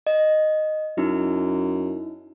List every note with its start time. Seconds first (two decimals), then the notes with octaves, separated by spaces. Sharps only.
0.07 D#5
0.98 F#2 D#4 E4